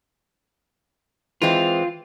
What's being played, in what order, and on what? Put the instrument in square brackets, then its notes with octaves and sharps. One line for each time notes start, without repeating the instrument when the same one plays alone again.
[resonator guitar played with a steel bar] E3 G#3 C4 [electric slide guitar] F4